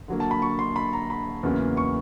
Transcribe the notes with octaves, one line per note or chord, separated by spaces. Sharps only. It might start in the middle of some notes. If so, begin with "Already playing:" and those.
D3 F#3 A#3
A5
B5
C#6
C6
B5
A#5
B5
E2 C#3 F#3 A#3 C#4
C#6